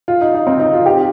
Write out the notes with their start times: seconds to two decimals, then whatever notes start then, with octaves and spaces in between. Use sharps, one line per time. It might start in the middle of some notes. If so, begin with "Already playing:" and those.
0.08 F4
0.21 D#4
0.34 D#4
0.47 C4
0.60 D#4
0.73 F4
0.86 G4